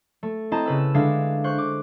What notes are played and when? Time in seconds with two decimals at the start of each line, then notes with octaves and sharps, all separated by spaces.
0.23 A3
0.51 C4 E4 D#5 A5 A#5
0.66 C#3 B4 E6
0.94 D3 G#3 D4 E5 F5
1.44 C5 C#6 F#6
1.58 D6